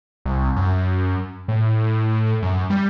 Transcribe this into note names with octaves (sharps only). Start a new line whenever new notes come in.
C2
F#2
A2
F#2
G3